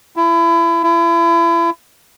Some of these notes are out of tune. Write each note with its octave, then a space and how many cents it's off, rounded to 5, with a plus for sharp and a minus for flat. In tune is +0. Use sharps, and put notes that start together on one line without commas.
E4 +30
E4 +35